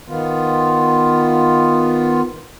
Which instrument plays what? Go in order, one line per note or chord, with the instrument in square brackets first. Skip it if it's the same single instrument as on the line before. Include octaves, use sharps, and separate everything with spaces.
[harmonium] D#3 B3 F4